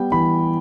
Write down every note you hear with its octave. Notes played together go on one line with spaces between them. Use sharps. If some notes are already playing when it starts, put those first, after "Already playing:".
Already playing: G3 B3 G5
E3 B5